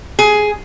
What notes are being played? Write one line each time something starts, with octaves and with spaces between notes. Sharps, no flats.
G#4